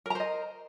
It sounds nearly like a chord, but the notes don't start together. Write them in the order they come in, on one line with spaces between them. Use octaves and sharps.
A#4 A#5 C5 D#5